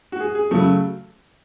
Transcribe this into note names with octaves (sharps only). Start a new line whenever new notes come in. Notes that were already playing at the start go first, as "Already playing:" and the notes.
F#4
G#4
G#4
C#3 F#3 A3